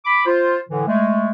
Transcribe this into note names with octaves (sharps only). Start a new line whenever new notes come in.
B5 D6
F4 C5
A2 D3 E3
G#3 A3